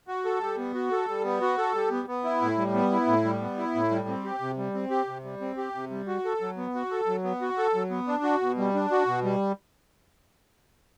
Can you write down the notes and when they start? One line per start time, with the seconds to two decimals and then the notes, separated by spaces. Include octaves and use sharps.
0.08 F#4
0.25 A4
0.41 G3
0.58 B3
0.74 F#4
0.91 A4
1.08 G3
1.24 B3
1.41 F#4
1.58 A4
1.75 G3
1.91 B3
2.08 B3
2.24 E4
2.42 A2
2.58 G3
2.74 B3
2.92 E4
3.07 A2
3.25 G3
3.41 B3
3.58 E4
3.75 A2
3.91 G3
4.08 C4
4.24 G4
4.41 C3
4.57 G3
4.74 C4
4.90 G4
5.07 C3
5.24 G3
5.41 C4
5.57 G4
5.74 C3
5.90 G3
6.08 F#4
6.25 A4
6.41 F#3
6.57 B3
6.75 F#4
6.91 A4
7.07 F#3
7.24 B3
7.41 F#4
7.58 A4
7.74 F#3
7.90 B3
8.07 D4
8.24 F#4
8.41 B2
8.58 G3
8.75 D4
8.91 F#4
9.07 B2
9.24 G3